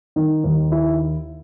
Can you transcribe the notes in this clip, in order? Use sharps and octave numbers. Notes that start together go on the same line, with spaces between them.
D#3
D#2
E4